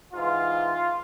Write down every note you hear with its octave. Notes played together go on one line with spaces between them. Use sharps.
G#2 E3 F4